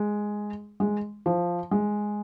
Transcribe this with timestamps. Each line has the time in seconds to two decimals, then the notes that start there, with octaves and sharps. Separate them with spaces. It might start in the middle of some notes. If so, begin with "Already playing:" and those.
Already playing: G#3
0.80 G#3
1.26 F3
1.71 G#3